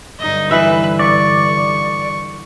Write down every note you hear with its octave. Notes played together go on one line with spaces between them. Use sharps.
G2 D3 D#4 D#5
E3 B4 E5
D5 C#6